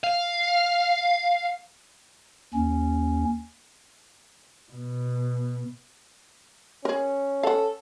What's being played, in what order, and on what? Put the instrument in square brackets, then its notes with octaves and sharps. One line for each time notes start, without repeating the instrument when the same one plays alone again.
[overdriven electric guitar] F5
[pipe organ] D#2 C#4
[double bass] B2
[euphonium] C#4 [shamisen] G#4 A#4
[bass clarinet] A4 [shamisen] F5 F#5